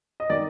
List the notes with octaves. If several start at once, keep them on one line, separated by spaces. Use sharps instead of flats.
D#5
D#3 D5